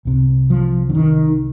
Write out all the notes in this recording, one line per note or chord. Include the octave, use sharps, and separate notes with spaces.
C2 C3
F3
D3
D#3